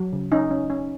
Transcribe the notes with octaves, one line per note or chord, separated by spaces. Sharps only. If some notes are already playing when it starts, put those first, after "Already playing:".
Already playing: F#3
C#3
C#4 D#4
C#4
C#4